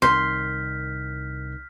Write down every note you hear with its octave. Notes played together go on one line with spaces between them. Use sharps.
C2 D#3 C6 F6 G6 B6